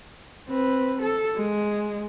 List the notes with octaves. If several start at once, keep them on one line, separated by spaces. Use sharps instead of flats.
C4 B4
A4
G#3